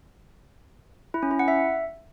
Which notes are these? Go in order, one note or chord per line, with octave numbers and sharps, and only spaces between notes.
E4
C#4
E4
F#5
E5